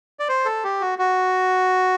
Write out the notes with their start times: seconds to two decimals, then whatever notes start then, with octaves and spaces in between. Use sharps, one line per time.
0.19 D5
0.29 C5
0.45 A4
0.64 G4
0.81 F#4
0.99 F#4